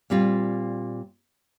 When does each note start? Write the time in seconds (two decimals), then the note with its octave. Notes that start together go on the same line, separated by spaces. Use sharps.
0.10 A#2 G3 C4 F4